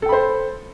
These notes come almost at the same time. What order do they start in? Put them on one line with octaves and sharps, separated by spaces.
A4 G5 B5 C5